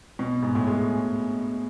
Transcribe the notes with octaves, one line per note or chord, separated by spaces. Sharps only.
B2
G#2
A2
G#3